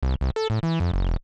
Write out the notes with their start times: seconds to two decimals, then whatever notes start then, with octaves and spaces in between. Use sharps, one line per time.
0.03 C2
0.21 C2
0.36 A4
0.50 A2
0.63 E3
0.80 F2
0.93 F#1
1.08 E1